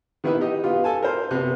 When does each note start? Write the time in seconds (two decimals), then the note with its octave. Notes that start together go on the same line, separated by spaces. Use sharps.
0.24 D#3 B3 E4 G4 B4
0.40 D#4 G4 D#5
0.64 B3 F4 G4
0.84 A4 G#5 A5
1.03 A#4 C5
1.31 C3 B3